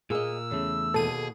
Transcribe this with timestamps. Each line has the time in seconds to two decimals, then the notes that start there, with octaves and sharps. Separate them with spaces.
0.10 A#2 A#3 G#4 D#5 E6
0.51 E2 C#3 A3
0.94 D#2 G#2 B2 G#4 A4 D#7